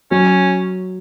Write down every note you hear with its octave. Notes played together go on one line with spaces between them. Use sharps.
F#3 C#4